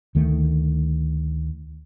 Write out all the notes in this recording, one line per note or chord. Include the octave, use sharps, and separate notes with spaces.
D2 D#3 A3